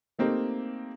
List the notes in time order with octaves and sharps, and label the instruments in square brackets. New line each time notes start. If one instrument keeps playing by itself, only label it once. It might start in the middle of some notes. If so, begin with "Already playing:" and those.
[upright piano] A3 A#3 C4 D#4 G4